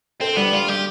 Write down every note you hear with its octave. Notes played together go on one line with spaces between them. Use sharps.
C4 A4
G3 B3
G3 F4
G3 G4